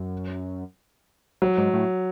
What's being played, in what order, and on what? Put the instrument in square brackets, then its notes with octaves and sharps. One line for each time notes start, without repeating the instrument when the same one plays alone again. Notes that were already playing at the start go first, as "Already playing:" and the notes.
Already playing: [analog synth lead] F#2
[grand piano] F#3
[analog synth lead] G#2
A2